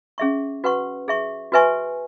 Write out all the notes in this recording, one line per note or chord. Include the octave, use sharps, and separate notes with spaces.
C#4 G#4 E5 C#6
F#4 B4 F#5 C#6
G#4 E5 C#6
F#4 B4 E5 G#5 C#6